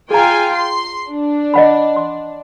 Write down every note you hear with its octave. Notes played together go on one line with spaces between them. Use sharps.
F4 G#4 G5 G#5 A#5
C6
D4
D#5 F#5 B5
C6